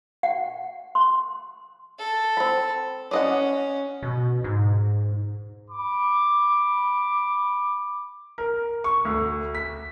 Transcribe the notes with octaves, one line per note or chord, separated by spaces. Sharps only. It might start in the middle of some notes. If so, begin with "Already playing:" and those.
F#5
C6
A4
C4 B5
C#4 D5 D#5 F#5
B2
G#2
B5 D6
A#4
C#6
D2
B6